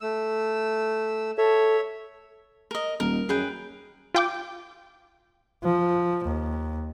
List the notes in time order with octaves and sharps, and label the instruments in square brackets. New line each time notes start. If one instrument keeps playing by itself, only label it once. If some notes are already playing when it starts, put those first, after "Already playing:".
[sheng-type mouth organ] A3 E6
[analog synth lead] A4 [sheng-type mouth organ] C#5 E5
[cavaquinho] A#4 D#5
[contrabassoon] D#1 [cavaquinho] A#4
[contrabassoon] F#2 [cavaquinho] G#4 B4 G5
[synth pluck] F4 G5 D6
[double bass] F3
D#2